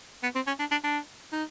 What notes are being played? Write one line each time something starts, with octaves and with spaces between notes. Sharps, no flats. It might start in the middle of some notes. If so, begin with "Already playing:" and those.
B3
C4
C#4
D4
D4
D4
D#4